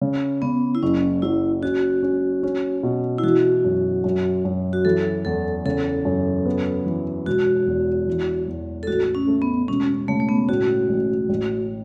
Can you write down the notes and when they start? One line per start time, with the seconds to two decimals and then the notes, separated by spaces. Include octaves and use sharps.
0.01 C#3
0.42 C#3 B3
0.75 E4
0.83 F#1 C#4
1.22 F#3 E4
1.63 C#4 F#4
2.03 C#4
2.43 C#4
2.83 B2
3.18 E4
3.23 E3 F#4
3.64 F#2
4.04 F#2
4.45 F#2
4.73 F#4
4.85 E3 A4
5.25 E2 A4
5.65 C#3 A4
6.05 F#2
6.45 B3
6.86 E3
7.26 E1 F#4
7.67 E2
8.08 E3
8.48 E2
8.83 A4
8.87 A1 F#4
9.15 C#4
9.27 A3
9.42 B3
9.68 E1 C#4
10.08 C#3 A3
10.20 A3
10.29 B3
10.48 A2 F#4
10.89 A1
11.29 A1